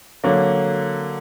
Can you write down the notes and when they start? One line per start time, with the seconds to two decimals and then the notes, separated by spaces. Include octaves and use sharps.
0.24 D3 F#3 A#3